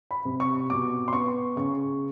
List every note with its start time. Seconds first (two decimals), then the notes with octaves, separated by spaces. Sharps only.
0.11 B5
0.25 C3
0.40 C#6
0.70 B2 D6
1.08 C6
1.13 B3 C#6
1.56 C#3 C#6